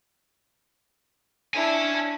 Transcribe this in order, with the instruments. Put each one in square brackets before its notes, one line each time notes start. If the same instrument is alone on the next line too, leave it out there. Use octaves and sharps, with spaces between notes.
[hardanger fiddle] D4 E4 [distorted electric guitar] C#5 G#5